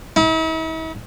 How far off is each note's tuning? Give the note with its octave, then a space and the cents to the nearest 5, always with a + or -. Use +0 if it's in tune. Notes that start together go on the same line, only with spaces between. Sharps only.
E4 -45